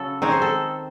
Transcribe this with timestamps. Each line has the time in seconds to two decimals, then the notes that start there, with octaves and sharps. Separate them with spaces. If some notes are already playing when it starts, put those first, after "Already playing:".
Already playing: C#3 F#3 A4
0.22 D#3 G#3 C4 C#5
0.32 C5
0.42 A4